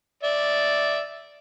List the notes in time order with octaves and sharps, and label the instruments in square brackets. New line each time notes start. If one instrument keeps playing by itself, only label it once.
[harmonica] D5 E5